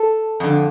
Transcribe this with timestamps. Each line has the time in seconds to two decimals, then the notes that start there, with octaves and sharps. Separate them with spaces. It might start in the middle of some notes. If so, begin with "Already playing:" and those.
Already playing: A4
0.40 F2 D3